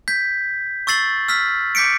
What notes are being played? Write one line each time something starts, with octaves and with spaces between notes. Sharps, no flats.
G6 G#6 B6
C#6 E6 A6 C7 F#7
E6 F6 B6
D6 G6 B6 C#7 D7